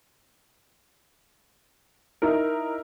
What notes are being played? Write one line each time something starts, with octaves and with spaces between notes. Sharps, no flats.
D#4 E4 A#4